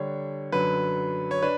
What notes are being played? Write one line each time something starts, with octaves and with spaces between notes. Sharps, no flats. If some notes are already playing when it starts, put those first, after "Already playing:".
Already playing: D3 G3 D4 C#5
F#2 D3 F#3 B4
C#5
D4 B4